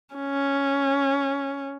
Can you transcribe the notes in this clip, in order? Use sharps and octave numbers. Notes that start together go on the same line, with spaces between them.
C#4